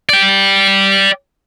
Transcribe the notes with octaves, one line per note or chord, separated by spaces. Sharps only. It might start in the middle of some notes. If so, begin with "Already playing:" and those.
D5 G5